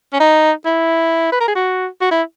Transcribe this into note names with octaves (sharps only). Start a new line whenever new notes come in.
C#4
D#4
E4
B4
A#4
G#4
F#4
F#4
E4